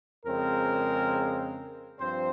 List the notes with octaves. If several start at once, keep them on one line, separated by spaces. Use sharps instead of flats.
F2 C#3 G#3 C4 A#4
G2 F3 C4 C5